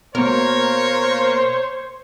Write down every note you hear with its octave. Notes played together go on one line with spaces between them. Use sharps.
B2 A#3 A#4 C5 C#5